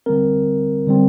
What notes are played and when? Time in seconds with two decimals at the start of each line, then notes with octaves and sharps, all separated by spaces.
0.06 D3 G3 C4 A#4
0.87 D3 G3 C4